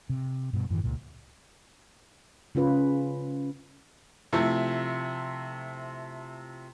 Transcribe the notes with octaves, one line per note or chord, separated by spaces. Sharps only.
C3
G2 B2
F#2 A2 D#3 E3
C#2 A#2
C#3 C#4 F4 B4
C3 F3 A3 E4